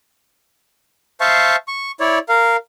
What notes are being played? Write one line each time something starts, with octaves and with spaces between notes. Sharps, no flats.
C5 E5 F5 A5 C#6
C#6
E4 C#5 D5
A#4 F5